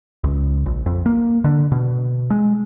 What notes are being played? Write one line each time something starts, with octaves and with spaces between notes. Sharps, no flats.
C#2
A#1
F2
A#3
D3
B2
G#3